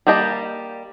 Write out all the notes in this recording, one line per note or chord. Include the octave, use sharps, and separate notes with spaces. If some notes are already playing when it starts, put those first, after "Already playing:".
G3 A#3 G4 D#5 A5